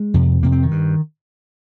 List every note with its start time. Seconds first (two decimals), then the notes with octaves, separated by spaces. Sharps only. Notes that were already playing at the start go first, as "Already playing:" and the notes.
Already playing: G#3
0.14 F2 C3
0.43 F2 C3 A#3
0.52 C4
0.63 D#3
0.71 G2